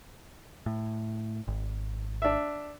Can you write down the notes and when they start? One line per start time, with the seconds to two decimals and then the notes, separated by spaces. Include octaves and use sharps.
0.66 A2
1.47 G#1
2.22 D4 E5